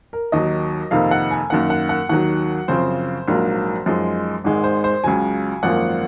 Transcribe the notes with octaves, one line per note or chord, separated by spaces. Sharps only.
A#4
D#2 D#3 F#3 D#5
F2 C3 D#3 A#3 D#4 F5
F#5
G#5
F#2 D#3 A#3 F#5
F#5
F#5
D#2 D#3 F#3 F#5
F#2 C#3 F3 C4 C5
A#1 G#2 F#3 A#3
F#2 F3 G#3 D#4
G#1 G#2 D#3 G#3
C5
C5
C#2 C#3 F#3 G#5
G#1 F#2 F3 A#3 F#5